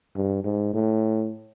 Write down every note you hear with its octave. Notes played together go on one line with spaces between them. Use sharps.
G2
G#2
A2